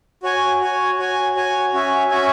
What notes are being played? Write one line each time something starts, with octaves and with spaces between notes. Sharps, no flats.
F#4 C#5 G#5
F#4 C#5 G#5
F#4 C#5 G#5
F#4 C#5 G#5
C#4 F#4 C#5 E5 G#5
C#4 F#4 C#5 E5 G#5